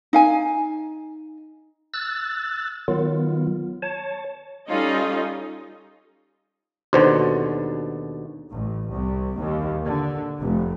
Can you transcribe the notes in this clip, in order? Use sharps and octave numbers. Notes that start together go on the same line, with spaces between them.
D#4 F5 G#5
E6 F#6 A6
D#3 F#3 B3 F4
C#5 A5
G3 C#4 D#4 F4 A4 D#5
D#2 B2 D3 F#4 C5
A1
C2
D#2
D3
F1